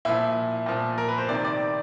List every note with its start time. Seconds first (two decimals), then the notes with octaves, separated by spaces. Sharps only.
0.05 A#2 F3 E4
0.66 A#2 F3
0.98 A#4
1.08 B4
1.18 C5
1.29 C3 D#3 D5
1.45 D5